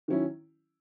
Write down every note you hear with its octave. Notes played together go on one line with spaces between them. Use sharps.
D#3 F#3 C#4 E4